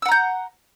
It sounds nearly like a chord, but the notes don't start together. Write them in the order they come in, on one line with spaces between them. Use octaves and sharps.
E6 F#5 A#5 G6